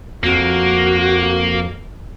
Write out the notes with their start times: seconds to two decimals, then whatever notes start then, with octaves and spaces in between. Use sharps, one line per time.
0.23 F2 A#3 F#4